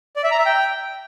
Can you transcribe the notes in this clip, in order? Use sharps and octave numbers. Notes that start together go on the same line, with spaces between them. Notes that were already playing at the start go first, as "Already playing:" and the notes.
D5
E5
A#5
E5
G5